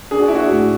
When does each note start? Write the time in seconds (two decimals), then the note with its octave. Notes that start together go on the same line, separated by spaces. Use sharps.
0.11 D4 G#4
0.20 F#4
0.28 E4
0.35 F#4
0.50 A2